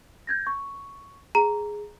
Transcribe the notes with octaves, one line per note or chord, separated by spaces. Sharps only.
G6 G#6 A#6
C#6
G#4 A#5